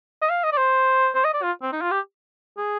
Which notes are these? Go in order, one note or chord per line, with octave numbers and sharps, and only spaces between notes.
D#5
F5
D#5
D5
C5
C5
D#5
D5
F4
C4
D#4
F4
G4
G#4